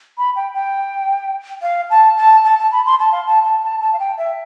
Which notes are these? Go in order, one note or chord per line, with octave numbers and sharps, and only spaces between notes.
B5
G5
G5
F5
A5
A5
A5
A5
B5
C6
A5
F5
A5
A5
A5
A5
F5
G5
E5